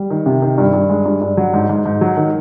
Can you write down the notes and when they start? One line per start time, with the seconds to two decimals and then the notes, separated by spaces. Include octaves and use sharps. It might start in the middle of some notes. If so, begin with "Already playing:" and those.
Already playing: G3
0.10 D#3
0.26 C3
0.42 D#3
0.58 G2
0.73 G2
0.89 G#3
1.05 G2
1.21 G2
1.37 F#3
1.54 G#2
1.69 G#2
1.86 G#2
2.01 F#3
2.17 D#3